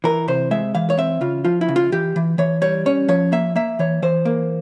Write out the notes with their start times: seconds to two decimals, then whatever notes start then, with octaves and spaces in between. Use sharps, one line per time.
0.04 E3 A#4
0.28 C3 C5
0.51 G#3 E5
0.75 E3 F5
0.90 C#5
0.98 C4 E5
1.21 C#3 F4
1.45 F3 F4
1.61 E4
1.69 C#3
1.76 F4
1.92 E3 G4
2.16 E3
2.38 E3 C#5
2.62 G3 C#5
2.86 C#4 C#5
3.08 F3 C#5
3.32 A#3 E5
3.56 A#3 E5
3.79 E3 C#5
4.02 E3 C5
4.25 A#3